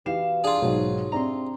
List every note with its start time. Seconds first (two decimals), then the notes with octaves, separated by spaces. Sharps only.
0.06 B2 E3 G4 F5 E7
0.44 D4 F4 G#4
0.62 B1 G#2 B2 F#3
1.12 C3 C4 D4 D5 A#5 C6